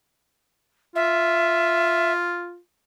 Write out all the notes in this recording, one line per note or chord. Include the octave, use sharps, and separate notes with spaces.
F4 E5